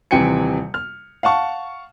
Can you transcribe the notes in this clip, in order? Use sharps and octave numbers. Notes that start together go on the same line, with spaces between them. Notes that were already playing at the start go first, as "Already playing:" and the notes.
D#1 C3 E3 G5 G#5 C#7
F6
F5 F#5 A5 C#6